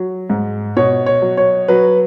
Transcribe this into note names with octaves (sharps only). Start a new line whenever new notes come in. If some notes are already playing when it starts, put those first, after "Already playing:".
Already playing: F#3
G#2
B2 C#5
C#5
F#3
C#5
F#3 B4